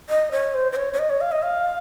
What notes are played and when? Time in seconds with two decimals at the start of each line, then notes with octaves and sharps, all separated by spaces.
0.09 D#5
0.32 C#5
0.54 C5
0.72 C5
0.76 C#5
0.93 C#5
0.99 D#5
1.10 C#5
1.21 F5
1.32 D#5
1.42 F5